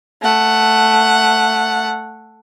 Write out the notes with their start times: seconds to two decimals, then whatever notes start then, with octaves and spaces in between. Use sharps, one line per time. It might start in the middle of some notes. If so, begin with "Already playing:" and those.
0.23 A3 F#5